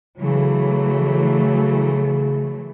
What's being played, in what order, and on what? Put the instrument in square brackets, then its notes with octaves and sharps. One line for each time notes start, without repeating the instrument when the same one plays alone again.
[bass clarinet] C#3 [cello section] E3 F#3 A3